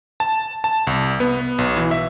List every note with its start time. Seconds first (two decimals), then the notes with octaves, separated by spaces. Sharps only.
0.20 A5
0.64 A5
0.87 C2
1.20 B3
1.58 B1
1.77 E3
1.91 E5